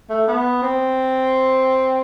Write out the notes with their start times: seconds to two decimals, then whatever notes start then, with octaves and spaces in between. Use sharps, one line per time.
0.10 A3
0.27 B3
0.62 C4